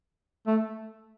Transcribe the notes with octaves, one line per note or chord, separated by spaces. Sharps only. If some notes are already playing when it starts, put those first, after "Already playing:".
A3